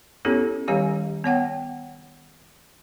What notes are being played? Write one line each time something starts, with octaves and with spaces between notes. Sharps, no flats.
B3 C#4 E4 G4 A4 C#5
D#3 G3 G4 C#5 F5 G#5
B3 C#5 F#5 G5